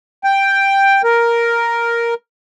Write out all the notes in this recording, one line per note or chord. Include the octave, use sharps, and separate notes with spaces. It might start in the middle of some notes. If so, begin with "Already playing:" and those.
G5
A#4